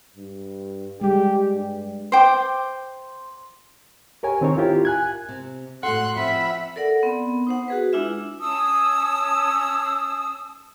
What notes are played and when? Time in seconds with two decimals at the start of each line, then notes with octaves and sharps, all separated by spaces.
0.17 G2
1.01 G3 G#3 G4
1.55 G2
2.12 C5 G5 D6
4.23 G4 A#4 C#5 G#5
4.41 D#3 C4 D#4 A#4 C#5
4.57 E4 F4 G4 A#4
4.85 G#5 F#6 G#6
5.29 C3
5.83 A2 F#4 A4 F#5 C6 F#6
6.16 F3 C4 E5 B5
6.76 A4 A#4 D5 F#5
7.03 B3 C4
7.47 D#4 C5 F#5
7.68 F#4 G#4 B4
7.93 G#3 D4 E4 F4 E5
8.40 C#4 A5 D#6 E6